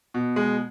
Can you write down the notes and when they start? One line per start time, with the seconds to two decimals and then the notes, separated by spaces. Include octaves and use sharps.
0.14 B2
0.36 G#3